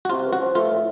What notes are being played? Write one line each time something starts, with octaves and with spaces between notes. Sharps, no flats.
F#4
C3 F4
C#2
F#4
F3
A3 F4
A2